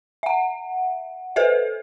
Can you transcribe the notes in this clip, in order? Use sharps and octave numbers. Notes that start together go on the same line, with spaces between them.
E5 F#5
A4 B4 C5 E5